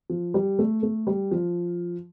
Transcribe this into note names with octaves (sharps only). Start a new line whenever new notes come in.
F3
G3
A3
A3
G3
F3